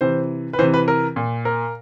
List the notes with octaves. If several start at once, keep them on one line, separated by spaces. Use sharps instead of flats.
C3 E3 C5
B4
C3 E3 C5
B4
A#4
A#2
A#4